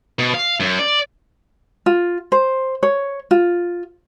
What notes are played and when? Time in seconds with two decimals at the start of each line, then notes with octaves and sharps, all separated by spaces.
0.19 B2
0.34 F5
0.60 F#2
0.79 D5
1.86 F4
2.32 C5
2.83 C#5
3.31 F4